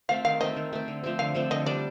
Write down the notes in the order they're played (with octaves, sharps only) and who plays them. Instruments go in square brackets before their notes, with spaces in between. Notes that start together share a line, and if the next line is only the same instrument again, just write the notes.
[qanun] A3 C4 [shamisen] F5
[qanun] D#3 [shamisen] F5
[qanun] A3 C4 [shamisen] D#5
[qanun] D#3
A3 C4
D3
F3 A3 C4
[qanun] D3 [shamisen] F5
[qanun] F3 A3 C4
[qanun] D3 [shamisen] D#5
[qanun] G3 D4 [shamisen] D5